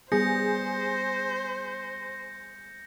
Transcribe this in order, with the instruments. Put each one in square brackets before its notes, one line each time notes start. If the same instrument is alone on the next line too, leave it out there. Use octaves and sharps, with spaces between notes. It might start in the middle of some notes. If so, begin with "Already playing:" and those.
[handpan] G3 B3 [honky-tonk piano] G#4 [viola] C5 [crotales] G6 A#6 C#7